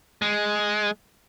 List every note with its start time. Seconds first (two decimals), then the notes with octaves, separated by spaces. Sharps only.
0.22 G#3